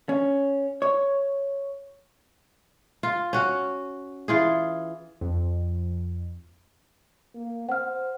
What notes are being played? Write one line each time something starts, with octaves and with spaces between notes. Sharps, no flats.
C#4
C#5
F4
C#4 F#4
E3 F4 G#4
F2
A#3
C5 F#5 F6